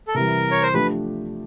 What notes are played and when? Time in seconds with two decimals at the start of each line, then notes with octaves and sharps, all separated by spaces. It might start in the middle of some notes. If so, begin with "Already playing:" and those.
0.07 A4
0.15 C3 E3 G3 A#4
0.51 C#5
0.62 C5
0.74 F3 A3 D4 G4 B4